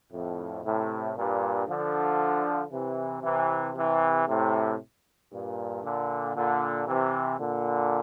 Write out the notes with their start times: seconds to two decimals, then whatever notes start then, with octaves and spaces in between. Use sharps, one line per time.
0.12 F2 A2
0.64 A2 C3
1.15 G2 A#2
1.68 D3 F3
2.72 C3 E3
3.23 C3 E3
3.75 C3 E3
4.28 A2 C3
5.32 G2 A#2
5.83 A#2 D3
6.35 A#2 D3
6.87 C3 E3
7.39 A#2 D3